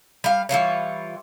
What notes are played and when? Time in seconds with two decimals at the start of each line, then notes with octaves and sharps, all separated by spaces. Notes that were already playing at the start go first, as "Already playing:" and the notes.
0.24 G3 F5
0.49 E3 G3 F4 C#5